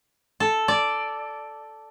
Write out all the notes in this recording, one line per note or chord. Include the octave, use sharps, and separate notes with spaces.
A4
D5